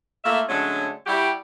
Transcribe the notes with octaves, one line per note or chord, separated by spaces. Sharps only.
A3 A#3 F4 E5
D3 F#3 G#3 A3 C#4 D4
G3 E4 F#4 G4